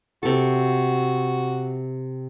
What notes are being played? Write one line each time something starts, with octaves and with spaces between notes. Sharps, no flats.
C3 F#4 A4